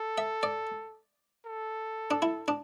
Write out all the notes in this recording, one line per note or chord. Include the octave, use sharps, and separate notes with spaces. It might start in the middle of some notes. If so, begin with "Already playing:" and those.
Already playing: A4
E5
D5
A4
D4
E4
D4